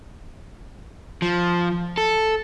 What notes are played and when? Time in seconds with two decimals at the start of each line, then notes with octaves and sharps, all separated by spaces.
1.22 F3
1.98 A4